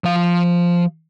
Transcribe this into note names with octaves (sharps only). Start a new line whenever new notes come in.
F3 F5